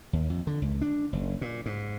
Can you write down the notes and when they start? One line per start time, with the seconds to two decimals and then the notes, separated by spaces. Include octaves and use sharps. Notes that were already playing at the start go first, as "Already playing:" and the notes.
0.13 D#2
0.30 F2
0.47 D3
0.62 C#2
0.82 D4
1.13 F#1
1.41 A#2
1.66 G#2